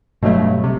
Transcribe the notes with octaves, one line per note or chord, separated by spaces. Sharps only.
G1 G2 B2 F#3 A3
C3